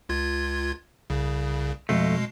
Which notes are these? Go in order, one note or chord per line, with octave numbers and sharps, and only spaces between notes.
C#2 F4 G#6
C2 C#3
F2 B2 G#3 A3 C7